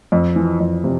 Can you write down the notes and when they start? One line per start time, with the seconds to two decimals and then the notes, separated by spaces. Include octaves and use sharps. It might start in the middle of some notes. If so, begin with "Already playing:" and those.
0.12 F2
0.36 E3
0.60 F2
0.84 C3